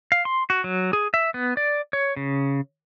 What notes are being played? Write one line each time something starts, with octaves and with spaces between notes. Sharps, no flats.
F5
C6
F#4
F#3
G#4
E5
B3
D5
C#5
C#3